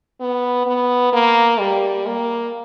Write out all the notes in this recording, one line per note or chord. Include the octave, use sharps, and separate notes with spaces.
B3
B3
A#3
G3
A#3